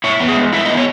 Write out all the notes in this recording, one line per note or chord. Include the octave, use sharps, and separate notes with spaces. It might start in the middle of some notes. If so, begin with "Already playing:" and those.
E4 C#5
B3
G#4
G#3
E4 E5
B3 D#5
C#5